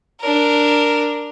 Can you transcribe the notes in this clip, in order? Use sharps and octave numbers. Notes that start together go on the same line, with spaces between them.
D4 A#4